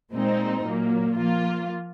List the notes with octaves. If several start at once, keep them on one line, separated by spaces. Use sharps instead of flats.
A#2 G#3 C4 D#4
A#2 F#3 A#3
F3 A#3 F4